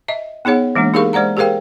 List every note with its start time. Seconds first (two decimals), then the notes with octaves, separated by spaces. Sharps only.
0.08 D#5 E5
0.45 B3 D#4 G#4 C#5 F#5
0.75 E3 G#3 A#3 D4
0.94 D#4 G4 G#4 A#4 F5 C#6
1.13 G#3 C5 D5 F#5 A#5
1.37 G4 G#4 A#4 C5 F5 G5